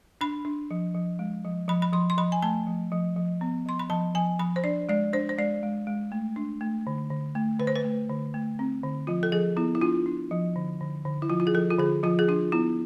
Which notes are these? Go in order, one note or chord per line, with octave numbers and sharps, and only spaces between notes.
D4 B5
D4
F3
F3
G#3
F3
F3 B5
B5
F3 C6
C6
F3 B5
G#5
A3 A5
F3
F3
F3
B3
F3 C6
B5
F3 A5
F3 G#5
F3 B5
C5
D4 D5
G#3 D5
D4 C5
C5
G#3 D5
G#3
G#3
A3
D4
A3
D3
D3
A3
D3 B4
C5
B4
A3
D3
A3
C4
D3
F3 F4
A4
F3 G#4
B3 E4
E4
D4 F4
D4
F3
D3
D3
D3
E4
F3 F4
F4
G#4
F3 A4
F4
D3 G#4
F3 F4
G#4
D4 F4
B3 E4